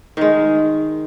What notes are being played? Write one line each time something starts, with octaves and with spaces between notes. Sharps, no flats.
D#3 G#3